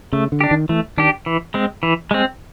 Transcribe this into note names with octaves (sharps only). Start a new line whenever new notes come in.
C#3 A3
D3
D4 G4
D#3
E3 A3
D#3 D4 G4
E3
G#3 C4
E3
G#3 C4